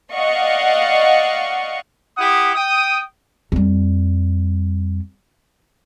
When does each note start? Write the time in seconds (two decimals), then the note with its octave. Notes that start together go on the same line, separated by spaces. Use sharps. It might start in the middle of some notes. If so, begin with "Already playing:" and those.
0.14 D5 D#5 F5 F#5 C#6
2.18 E4 G4 F#5 D#6
2.54 G5 D#6
3.52 F2 G3